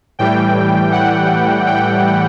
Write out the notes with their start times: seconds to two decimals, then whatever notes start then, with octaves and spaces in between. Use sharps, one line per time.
0.19 A2 E3 G3 G5
0.92 F#5
1.67 G5